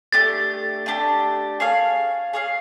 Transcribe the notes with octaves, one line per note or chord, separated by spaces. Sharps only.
A3 D4 G4 A6
A3 D4 G4
G#4 C#5 F5
G#4 C#5 F5